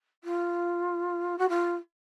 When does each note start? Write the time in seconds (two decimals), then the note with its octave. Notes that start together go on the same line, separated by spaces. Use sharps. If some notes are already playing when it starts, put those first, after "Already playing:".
0.24 F4
1.38 F#4
1.49 F4